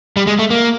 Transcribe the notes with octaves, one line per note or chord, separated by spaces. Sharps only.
G3
G#3
A3
A#3